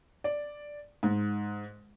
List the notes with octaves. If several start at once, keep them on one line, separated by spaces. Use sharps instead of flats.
D5
G#2